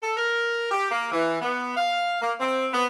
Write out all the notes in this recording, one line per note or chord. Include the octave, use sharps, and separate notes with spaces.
A4
A#4
G4
A#3
E3
B3
F5
A#3
C4
B3